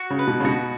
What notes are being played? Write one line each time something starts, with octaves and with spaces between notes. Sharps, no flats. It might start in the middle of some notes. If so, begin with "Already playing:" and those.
Already playing: F#4 F#5
C#3
B4
B2
C#3
B2 F#4